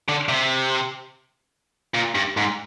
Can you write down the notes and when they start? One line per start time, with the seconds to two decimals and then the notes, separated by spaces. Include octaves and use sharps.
0.09 D3
0.29 C3
1.95 A#2
2.15 G2
2.37 G#2